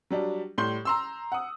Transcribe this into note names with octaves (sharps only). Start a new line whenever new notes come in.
F#3 G3 D4
A2 G3 C6 G6 G7
A#5 C6 E6
F#5 D#6